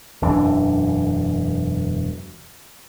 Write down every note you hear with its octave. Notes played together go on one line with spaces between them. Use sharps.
E1 F#2 E3 D4